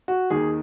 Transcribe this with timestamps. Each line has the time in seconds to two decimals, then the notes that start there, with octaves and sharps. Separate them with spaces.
0.08 F#4
0.30 D#2 D#3 G#4